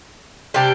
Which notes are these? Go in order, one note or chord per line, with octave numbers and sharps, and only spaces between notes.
C3 G3 D4 G4